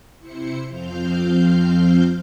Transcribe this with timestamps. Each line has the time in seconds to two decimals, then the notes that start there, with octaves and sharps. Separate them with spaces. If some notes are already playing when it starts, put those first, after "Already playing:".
0.19 C3 E4 C5 C#7
0.68 F2 F3 C4 F5 F6 G6